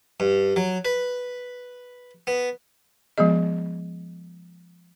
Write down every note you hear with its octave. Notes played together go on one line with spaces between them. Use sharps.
G2
F#3
B4
B3
F3 G#3 B3 G#4 D#5